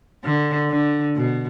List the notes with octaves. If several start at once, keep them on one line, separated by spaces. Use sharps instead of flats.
D3
D3
B2